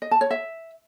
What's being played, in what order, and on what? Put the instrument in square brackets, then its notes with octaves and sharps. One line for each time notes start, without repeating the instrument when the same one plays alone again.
[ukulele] D#5
A5
C#5
E5